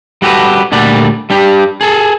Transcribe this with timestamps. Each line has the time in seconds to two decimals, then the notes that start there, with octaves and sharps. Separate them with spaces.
0.22 G3 F#4 G4 A4 B4
0.72 D2 A#2 G3 A4 D5 F#5
1.30 G3 D4 G4
1.81 G#4 A4